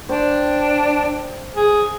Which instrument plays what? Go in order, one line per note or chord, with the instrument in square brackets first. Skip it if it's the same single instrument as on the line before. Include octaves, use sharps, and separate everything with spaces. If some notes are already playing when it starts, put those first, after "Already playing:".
[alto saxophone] D4 [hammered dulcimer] C5 G5
[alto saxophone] G#4